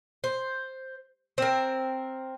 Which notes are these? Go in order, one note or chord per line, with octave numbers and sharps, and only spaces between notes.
C5
C4 A#4